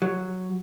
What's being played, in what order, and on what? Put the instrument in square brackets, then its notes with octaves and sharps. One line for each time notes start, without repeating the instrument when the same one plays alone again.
[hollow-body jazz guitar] F#3